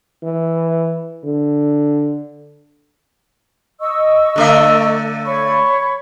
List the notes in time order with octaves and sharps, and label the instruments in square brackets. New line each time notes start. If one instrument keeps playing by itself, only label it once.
[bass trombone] E3
D3
[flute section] D#5 C#6 E6
[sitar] D3 A3 E5
[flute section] C#5 B5 C#6